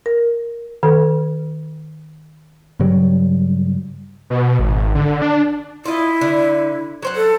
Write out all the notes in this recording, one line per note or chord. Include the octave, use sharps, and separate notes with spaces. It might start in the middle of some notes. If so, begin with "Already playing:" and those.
A#4
D#3 A4
G2 C#3 F#3 G3
B2
G#1
D3
D4
E4 F4 D#5
D3
F#3 C5 F#5
A4